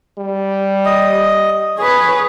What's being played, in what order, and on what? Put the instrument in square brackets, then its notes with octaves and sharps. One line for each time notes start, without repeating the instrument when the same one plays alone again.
[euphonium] G3
[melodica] D#5
[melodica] G#4 [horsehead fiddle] B4 C#5